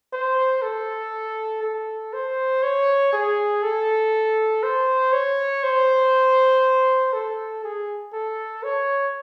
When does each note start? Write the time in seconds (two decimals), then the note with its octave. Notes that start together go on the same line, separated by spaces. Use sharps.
0.13 C5
0.62 A4
1.63 A4
2.13 C5
2.63 C#5
3.13 G#4
3.63 A4
4.63 C5
5.13 C#5
5.63 C5
7.13 A4
7.64 G#4
8.13 A4
8.64 C#5